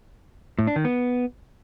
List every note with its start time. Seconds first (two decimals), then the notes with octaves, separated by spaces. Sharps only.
0.59 A2
0.67 D4
0.76 D#3
0.85 B3